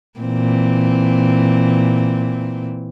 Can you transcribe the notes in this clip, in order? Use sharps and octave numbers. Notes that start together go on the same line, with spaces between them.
A#2 E3 C4